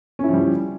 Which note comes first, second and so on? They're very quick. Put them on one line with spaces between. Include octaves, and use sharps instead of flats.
C#4 E4 F3 G3